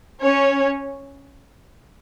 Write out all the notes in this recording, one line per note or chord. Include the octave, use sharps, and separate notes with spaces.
C#4 C#5